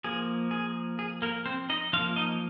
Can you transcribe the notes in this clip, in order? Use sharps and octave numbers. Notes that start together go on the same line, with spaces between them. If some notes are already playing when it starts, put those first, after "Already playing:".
F3 A#3 G#4
G#4
G#4
A#3 A#4
C4 C5
D#4 D#5
F3 A#3 F4 F5
D#4 D#5